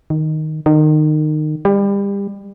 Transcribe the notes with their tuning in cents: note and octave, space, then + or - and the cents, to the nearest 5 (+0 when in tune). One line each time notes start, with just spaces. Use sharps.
D#3 +0
D#3 -25
G3 +30